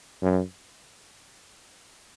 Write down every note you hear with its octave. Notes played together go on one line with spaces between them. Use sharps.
F#2